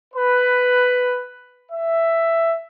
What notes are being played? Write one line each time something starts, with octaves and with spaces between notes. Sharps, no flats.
B4
E5